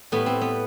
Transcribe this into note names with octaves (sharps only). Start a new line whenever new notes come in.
A2 G3 B3
C4
B3